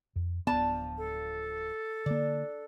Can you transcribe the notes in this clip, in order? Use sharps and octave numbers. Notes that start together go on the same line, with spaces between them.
F2
D1 F3 B3 D4 A5
A4
D3 A#3 D4